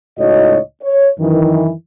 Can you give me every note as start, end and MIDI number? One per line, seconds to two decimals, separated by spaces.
0.19 0.57 37
0.19 0.57 45
0.19 0.57 63
0.19 0.57 66
0.19 0.57 73
0.19 0.57 75
0.82 1.08 73
1.19 1.71 42
1.19 1.71 51
1.19 1.71 52